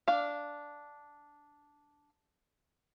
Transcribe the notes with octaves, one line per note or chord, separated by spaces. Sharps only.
D4 F5